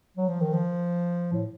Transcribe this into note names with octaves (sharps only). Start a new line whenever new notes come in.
F#3
F3
D#3
F3
A2